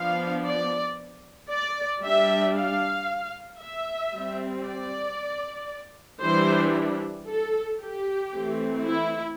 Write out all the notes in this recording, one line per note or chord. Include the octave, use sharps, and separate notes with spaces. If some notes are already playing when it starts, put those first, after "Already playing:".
Already playing: F3 B3 D4 F5
D5
D5
G3 D4 E5
F5
E5
G3 C4
D5
E3 G3 D4 C5
A4
G4
E3 A3 C4
E4